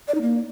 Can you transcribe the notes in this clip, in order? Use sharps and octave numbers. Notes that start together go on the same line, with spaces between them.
D5
D#4
A#3